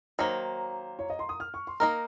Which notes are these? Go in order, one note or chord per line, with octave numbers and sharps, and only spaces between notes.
D#3 F#3 A#3 C5
C#5
D#5
C6
D#6
F6
C#6
C6
A#3 D#4 A#4 A#5